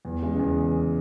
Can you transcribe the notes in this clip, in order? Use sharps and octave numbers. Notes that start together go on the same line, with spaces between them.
E2
C#3 G#3
E2